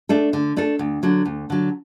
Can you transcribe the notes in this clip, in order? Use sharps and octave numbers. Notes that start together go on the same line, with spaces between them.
A3 D4 A4
D3
A3 D4 A4
D2
D3 F#3
D2
D3 F#3